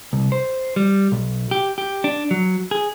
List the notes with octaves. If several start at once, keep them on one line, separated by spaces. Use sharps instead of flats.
C2
C5
G3
B1
G4
G4
D4
F#3
G#4